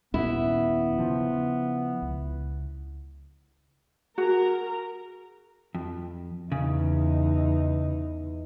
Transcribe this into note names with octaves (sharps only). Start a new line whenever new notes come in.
D#2 A#2 B3 C#4 E4
C#3 F3
C#2
F#4 G#4 A#4 A#5
F2
E2 C#3 D#4